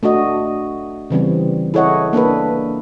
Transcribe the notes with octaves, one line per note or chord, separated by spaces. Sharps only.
A3 D4 F#4 D#5
C#3 E3 G3 C4
E4 G#4 A4 C#5 D#5 F#5
A#3 D4 A4 B4